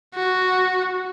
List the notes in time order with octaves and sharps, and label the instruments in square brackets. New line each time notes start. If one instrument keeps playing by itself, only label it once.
[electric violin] F#4